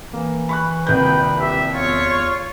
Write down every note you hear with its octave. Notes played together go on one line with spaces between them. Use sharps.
E3 A#3
B5 C#6 F#6
D#1 C2 B4 G5 G6
G4 E5
E2 F4 C#5 C#6